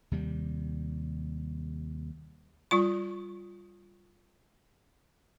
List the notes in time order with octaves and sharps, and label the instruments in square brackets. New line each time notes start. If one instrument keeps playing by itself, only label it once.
[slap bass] D#2 C3 G3
[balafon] G3 F4 C#6